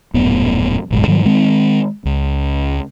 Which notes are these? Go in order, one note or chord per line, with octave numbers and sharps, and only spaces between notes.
D#1 F#2 A2 B3
F#1 B1 G#2
G#2 D#3 F#3 G3
D#3 G#3 C4
C#2